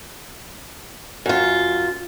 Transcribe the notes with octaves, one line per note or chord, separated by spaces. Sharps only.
F#2 F4